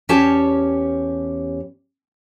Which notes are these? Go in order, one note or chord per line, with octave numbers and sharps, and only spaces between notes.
E2 C#4 G4 C#5 A5